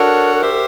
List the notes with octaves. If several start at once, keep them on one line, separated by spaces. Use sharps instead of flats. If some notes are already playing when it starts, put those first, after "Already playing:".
Already playing: D4 F#4 A4 A#4 C#5 F#5
G4 C5 E5